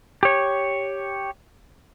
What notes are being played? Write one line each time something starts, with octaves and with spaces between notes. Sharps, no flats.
G4 C#5